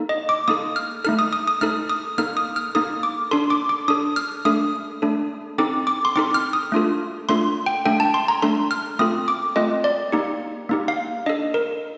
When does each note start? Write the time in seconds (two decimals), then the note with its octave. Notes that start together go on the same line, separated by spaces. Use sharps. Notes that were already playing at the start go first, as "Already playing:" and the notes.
Already playing: A#3 D#4 A4
0.09 D#5
0.29 D6
0.48 A#3 D#4 A4 D#6
0.76 F6
1.04 A3 D#4 A4 F6
1.19 D#6
1.33 D#6
1.47 D#6
1.61 A3 D#4 A4 F6
1.89 D#6
2.18 A#3 D#4 A4 F6
2.37 D#6
2.56 F6
2.75 A#3 D#4 A4 D#6
3.03 D6
3.31 D4 A4 C6
3.50 D6
3.69 D6
3.88 D4 A4 D#6
4.16 F6
4.45 A3 D4 A4 D#6
5.02 A3 D4 A4
5.58 C4 D#4 A4 D6
5.87 D6
6.05 C6
6.16 C4 D#4 A4 D6
6.34 F6
6.53 D#6
6.72 A3 D4 F4 A4
7.29 A3 D4 F4 A4 C6
7.66 G5
7.85 A3 D4 A4 G5
8.00 A5
8.14 C6
8.28 A#5
8.42 A3 D4 A4 C6
8.71 F6
8.99 A3 C4 F4 A4 D#6
9.28 D6
9.56 A3 C4 F4 A4 D#5
9.84 D5
10.12 A#3 D#4 G4
10.69 A#3 D#4 G4
10.88 F5
11.26 D4 A4 D#5
11.54 A#4